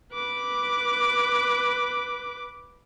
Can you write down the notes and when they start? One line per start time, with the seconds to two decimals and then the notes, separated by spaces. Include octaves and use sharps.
0.13 B4 D6